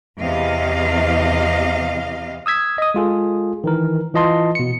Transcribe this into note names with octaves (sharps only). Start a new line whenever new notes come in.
E2 C3 D#5 F5
D#6 E6 G#6 B6
D#5 D#6
G#3 F4 G#4 A4
D#3 E3 A#4
E3 F4 D#5 A5 C6
B2 C#7